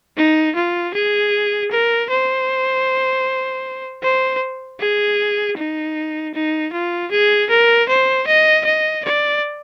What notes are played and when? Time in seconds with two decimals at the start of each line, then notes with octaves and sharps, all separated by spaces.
0.17 D#4
0.56 F4
0.94 G#4
1.71 A#4
2.10 C5
4.03 C5
4.81 G#4
5.58 D#4
6.35 D#4
6.73 F4
7.12 G#4
7.50 A#4
7.89 C5
8.27 D#5
8.65 D#5
9.05 D5